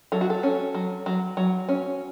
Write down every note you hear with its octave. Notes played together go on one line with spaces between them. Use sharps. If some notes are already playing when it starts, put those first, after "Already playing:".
F#3 A4
F#4
A4
C#4
F#3
F#3
F#3
C#4